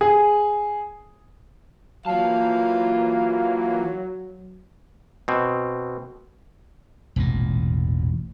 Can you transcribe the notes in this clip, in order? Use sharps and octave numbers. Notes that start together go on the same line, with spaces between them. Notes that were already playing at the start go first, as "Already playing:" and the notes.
G#4
E3 F#3 A#3 F4 F5 A5
B2 C4
E1 A1 A#2